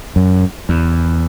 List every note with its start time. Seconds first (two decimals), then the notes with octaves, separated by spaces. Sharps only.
0.16 F#2
0.69 E2